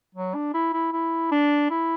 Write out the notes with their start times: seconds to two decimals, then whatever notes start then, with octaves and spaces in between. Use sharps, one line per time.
0.15 F#3
0.34 D4
0.54 E4
0.73 E4
0.93 E4
1.32 D4
1.70 E4